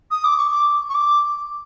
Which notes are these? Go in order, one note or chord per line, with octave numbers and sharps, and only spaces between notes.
D#6
D6
C#6
D6
C#6
D6